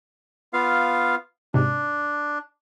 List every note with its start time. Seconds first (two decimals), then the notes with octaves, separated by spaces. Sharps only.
0.53 B3 F4 F5
1.54 G#2 C3 D4